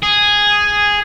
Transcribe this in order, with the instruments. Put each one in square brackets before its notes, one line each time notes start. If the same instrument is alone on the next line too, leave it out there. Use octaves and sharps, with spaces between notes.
[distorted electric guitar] G#4